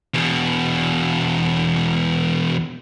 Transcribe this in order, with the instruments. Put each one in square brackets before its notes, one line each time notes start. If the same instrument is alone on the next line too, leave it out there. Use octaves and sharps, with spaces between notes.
[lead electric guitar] E2 B2